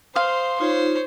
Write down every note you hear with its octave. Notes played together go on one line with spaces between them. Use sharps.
C5 F5 C6 D#6
D#4 F4 C5 C#5